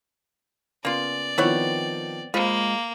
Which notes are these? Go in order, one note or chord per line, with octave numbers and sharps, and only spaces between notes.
C#3 A#3 B3 F4 D5
D#3 F3 B3 C4 E4 C#5 F#5
G#3 A#3 F4 C5 B5